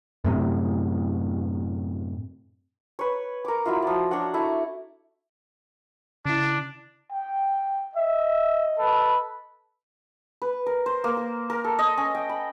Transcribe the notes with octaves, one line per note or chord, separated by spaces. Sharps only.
F#2 A2 C3
B4 C#5
A#4 D6
F#3 E4 F4
F3 D5
D4 F#4 C#5 F#5
A3 E4
C#3 D4 E4
G5
D#5 E5
A4 B4
B4
A#4
C5
A#3
A#4
A#4
A4
D#5
C#4
G5
B5